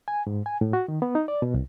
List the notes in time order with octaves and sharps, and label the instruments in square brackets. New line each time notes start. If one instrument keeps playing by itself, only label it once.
[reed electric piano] G#5
G#2
G#5
A2
F#4
D#3
B3
D#4
D5
B2
C2